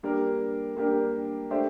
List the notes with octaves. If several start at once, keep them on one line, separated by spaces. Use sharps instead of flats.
G3 A#3 D4 G4 A#4
G3 A#3 D4 G4 A#4
A3 D4 G4 C5